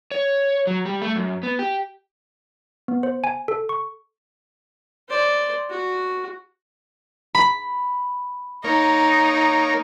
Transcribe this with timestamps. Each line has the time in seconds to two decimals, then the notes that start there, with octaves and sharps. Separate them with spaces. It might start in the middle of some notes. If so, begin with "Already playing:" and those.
0.11 C#5
0.67 F#3
0.86 G3
1.02 A3
1.16 F#2
1.43 B3
1.59 G4
2.88 B3
3.03 C5
3.24 G#5
3.48 A4
3.69 C#6
5.09 C5 D5
5.70 F#4
7.35 B5
8.64 A#3 D#4 A#4 C#5